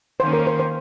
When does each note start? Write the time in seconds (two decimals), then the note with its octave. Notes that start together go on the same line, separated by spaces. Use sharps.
0.20 D#3 A#3 C#4 C5
0.33 A#4
0.47 C5
0.60 C5